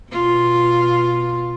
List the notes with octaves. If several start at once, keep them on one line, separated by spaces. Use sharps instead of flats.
B2 F4